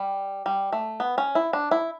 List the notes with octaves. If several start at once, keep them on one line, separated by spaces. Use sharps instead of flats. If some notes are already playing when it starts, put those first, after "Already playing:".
Already playing: G3
G3
A3
B3
C#4
E4
D4
E4